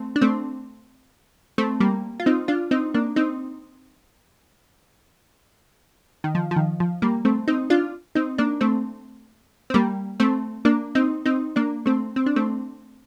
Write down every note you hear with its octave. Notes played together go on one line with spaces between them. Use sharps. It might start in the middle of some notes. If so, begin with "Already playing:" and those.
Already playing: A3 C4
D4
A3 C4
A3 C4
G3 A#3
F4
C4 D#4
D4 F4
C4 D#4
A#3 D4
C4 D#4
D#3
F3
F3
D#3
F3
G3 A#3
A3 C4
C4 D#4
D4 F4
C4 D#4
A#3 D4
A3 C4
C4
G3 A#3
A3 C4
A#3 D4
C4 D#4
C4 D#4
A#3 D4
A3 C4
C4
D4
A3 C4